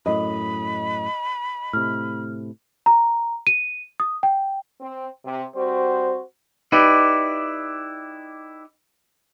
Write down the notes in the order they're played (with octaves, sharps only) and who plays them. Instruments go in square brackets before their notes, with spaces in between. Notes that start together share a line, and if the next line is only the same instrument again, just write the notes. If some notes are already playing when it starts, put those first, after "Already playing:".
[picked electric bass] F#2 A2 [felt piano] D#5 [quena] B5
[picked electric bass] A2 C3 [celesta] F6
[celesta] A#5
D#7
D#6
G5
[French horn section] C4
C3
[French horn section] G3 C4 F#4 [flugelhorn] C5
[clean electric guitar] D#4 E4 G4 B4 D5